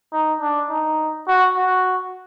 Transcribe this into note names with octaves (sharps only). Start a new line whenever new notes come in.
D#4
D4
D#4
F#4
F#4